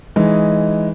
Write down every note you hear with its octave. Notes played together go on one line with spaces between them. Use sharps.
E3 G#3 D#4